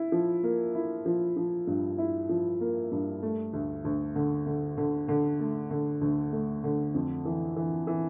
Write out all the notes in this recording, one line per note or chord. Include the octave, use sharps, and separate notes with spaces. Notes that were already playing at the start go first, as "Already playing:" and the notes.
Already playing: E4
F3
A#3
E4
F3
F3
G2
E4
F3
A#3
G2
A3
D2
D2
D3
D3
D3
D3
A3
D3
D2
A3
D3
F2
E3
E3
E3